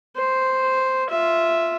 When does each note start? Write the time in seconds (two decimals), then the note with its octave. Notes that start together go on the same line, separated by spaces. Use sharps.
0.17 C5
1.09 F4 E5